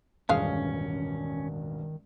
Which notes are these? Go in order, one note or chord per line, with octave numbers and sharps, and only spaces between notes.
E1 A1 G2 D#3 F3 G#3 C#4 F5